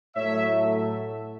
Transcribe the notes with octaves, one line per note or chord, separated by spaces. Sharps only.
A2 F#3 A3 C#5 E5